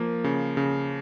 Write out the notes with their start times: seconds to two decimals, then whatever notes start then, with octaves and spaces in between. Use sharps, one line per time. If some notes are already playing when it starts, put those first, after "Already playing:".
Already playing: F3 A#3
0.24 C#3
0.57 C#3